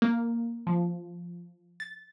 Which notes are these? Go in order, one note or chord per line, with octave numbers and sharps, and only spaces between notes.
A#3
F3
A6